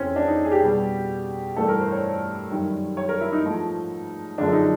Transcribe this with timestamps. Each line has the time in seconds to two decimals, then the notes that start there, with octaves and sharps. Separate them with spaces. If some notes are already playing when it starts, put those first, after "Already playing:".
Already playing: F2 C#3 E3 C4 C#4
0.16 D4
0.28 D#4
0.45 G#4
0.51 G4
0.63 B2 G3
1.56 G2 E3 A3 A4
1.68 A#4
1.80 C5
1.92 C#5
2.50 F#2 D#3 G3
2.97 C#5
3.09 A#4
3.21 E4
3.32 D#4
3.44 G#2 F3 A3
4.38 F#2 D3 F3 G#3 D4
4.53 D#4